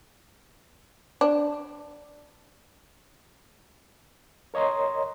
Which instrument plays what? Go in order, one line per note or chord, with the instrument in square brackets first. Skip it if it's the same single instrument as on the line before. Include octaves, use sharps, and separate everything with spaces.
[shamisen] D4
[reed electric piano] A#4 C#5 D#5 A#5 C6